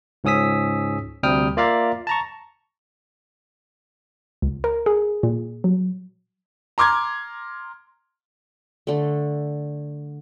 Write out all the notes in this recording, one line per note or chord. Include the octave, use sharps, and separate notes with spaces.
C#2 G#2 C#4 D#6 E6 B6
D2 C3 G3 G5 D#6 F6
A#3 F4 D5 E5 F5 A#5
A5 A#5 C#6
C#2
A#4
G#4
A#2
F#3
A#5 C6 D6 F6 G#6
D3 A3